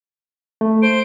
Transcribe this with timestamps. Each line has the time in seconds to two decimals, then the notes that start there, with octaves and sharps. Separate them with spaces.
0.61 A3
0.83 C5 D7